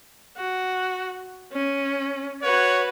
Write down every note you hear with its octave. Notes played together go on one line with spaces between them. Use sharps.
F#4
C#4
F#4 B4 C#5